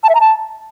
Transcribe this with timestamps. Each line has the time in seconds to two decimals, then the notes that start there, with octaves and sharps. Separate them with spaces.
0.04 A5
0.09 E5
0.15 A#5
0.20 A5